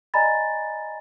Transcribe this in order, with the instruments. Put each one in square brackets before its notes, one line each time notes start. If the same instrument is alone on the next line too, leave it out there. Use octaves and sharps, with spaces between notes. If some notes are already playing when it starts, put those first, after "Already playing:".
[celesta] D5 D#5 G#5 A#5 B5 A6